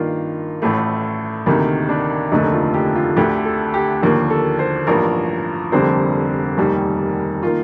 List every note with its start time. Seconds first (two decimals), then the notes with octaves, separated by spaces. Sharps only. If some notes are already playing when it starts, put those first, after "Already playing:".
Already playing: G2 D#3 A#3 F4
0.62 A1 A2 A3
1.46 D2 C3 D#3 A#3
1.89 D4
2.31 F1 D#2 D3 A3 D#4
2.53 F4
2.74 G4
2.95 F4
3.17 D2 D3 A3 G4
3.45 A4
3.74 G4
4.02 D#2 D3 F3 A#3 G4
4.30 A4
4.59 C5
4.87 A1 G2 F3 A#3 A#4
5.72 F1 F2 D3 G3 A#3 C5
6.57 F1 D#2 D#3 G3 A#4
7.43 D#3 A#3 F4